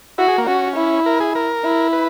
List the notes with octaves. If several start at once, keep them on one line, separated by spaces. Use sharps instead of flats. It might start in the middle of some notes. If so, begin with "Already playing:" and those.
E4 F#4
G#4
A#3
C#4 F#4
E4
A#4
G#4
A#4
E4
B4